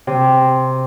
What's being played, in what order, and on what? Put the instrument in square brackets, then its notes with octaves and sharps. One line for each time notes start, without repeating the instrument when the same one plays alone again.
[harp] C3